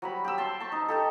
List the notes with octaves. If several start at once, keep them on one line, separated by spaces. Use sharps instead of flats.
F#3 G3 B5
G4 E6
A5 C6
A5 C#6
D#4
D#4 G4 A4